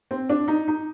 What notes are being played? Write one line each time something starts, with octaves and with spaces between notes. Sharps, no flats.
C4
D4
D#4
D#4